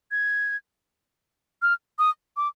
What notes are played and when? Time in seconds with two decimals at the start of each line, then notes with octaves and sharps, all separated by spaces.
0.11 G#6
1.62 F6
1.99 D#6
2.37 D6